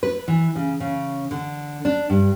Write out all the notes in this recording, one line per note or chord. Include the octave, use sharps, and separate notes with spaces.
B4
E3
C#3
C#3
D3
D4
G2